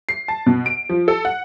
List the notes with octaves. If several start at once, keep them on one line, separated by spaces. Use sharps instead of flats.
C7
A5
B2
D7
F3
A4
F#5